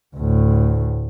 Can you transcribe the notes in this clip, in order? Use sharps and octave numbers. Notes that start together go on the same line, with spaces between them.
D2 A2